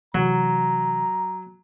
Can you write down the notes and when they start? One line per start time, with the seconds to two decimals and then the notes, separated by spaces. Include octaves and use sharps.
0.15 C3 E3 F#3 A#5